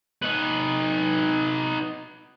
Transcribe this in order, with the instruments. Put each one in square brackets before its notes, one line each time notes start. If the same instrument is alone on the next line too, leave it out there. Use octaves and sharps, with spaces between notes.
[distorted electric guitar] D#4 B4